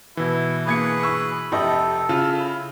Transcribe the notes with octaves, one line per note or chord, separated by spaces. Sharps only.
B2 E3 E4
A#3 G#4 B4 B5 G#6 C#7
C#6 E6
F1 C3 A4 D#5 G5
C#3 F4
E4